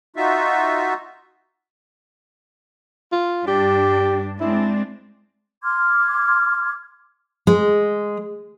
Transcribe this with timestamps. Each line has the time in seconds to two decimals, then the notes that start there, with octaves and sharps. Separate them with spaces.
0.16 D#4 F4 F#4 E5
3.12 F4
3.47 G2 D4 G4
4.40 G#3 C4 D4 E4
5.64 C6 D6 F6 G#6
7.47 G#3